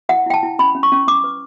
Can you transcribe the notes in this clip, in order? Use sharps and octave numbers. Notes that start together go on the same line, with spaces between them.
E4 F#5
E4 G5
A5
E4
C#4 B5
C#4
C#6
C#4
C#4 D6
B4